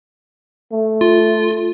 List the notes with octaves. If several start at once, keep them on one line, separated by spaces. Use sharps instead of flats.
A3
F4